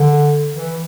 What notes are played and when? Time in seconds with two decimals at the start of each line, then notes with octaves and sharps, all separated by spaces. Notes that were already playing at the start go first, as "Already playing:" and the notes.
Already playing: D3
0.53 E3